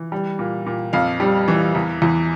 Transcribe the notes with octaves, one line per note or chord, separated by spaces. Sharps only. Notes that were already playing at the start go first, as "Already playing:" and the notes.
Already playing: E3
G3
A#2
A#2
F2 F5
G3
E3
E2
E2